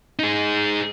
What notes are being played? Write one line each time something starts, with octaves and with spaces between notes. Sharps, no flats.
D#4 G#4